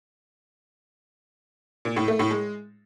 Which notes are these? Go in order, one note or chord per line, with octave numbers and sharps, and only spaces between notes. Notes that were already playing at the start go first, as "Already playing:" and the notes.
A#2
A2
A3
A2
G#3